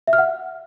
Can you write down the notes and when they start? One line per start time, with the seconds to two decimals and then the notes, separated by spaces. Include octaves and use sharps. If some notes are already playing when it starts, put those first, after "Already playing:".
0.07 E5
0.13 F6
0.18 F#5